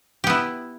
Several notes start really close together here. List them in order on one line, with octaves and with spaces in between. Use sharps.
G4 B3 E4